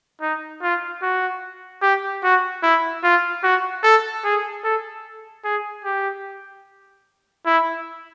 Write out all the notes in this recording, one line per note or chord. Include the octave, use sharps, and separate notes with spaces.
D#4
F4
F#4
G4
F#4
E4
F4
F#4
A4
G#4
A4
G#4
G4
E4